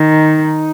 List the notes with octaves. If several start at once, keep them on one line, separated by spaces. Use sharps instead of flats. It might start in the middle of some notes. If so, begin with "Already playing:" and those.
Already playing: D#3 D#4